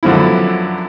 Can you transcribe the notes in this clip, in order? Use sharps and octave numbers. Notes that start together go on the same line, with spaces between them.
F#2 D3 F3 B3 E4